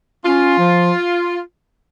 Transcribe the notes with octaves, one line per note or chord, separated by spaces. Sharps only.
C#4 F4
F3